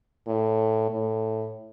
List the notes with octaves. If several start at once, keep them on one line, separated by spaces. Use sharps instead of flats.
A2
A2